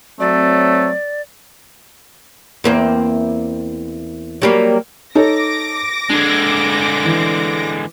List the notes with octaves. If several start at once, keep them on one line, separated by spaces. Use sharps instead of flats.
F#3 A3 C4 D5
E2 A#3 C4
F#3 G3 A#3
D#4 A4 C#5 D6 A#6
D3 G#3 D4
E3